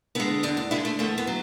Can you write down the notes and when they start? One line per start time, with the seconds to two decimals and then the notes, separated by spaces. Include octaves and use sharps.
0.15 D3 G#3 B3
0.43 E2 D4
0.57 D4
0.71 D3 G#3 E4
0.85 A3
0.99 E2 A3
1.18 B3
1.27 F#3